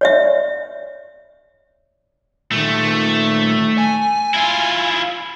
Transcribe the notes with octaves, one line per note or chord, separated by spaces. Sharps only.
C#5 D5 E5
A#2 D#3 A3
G#5
E4 F4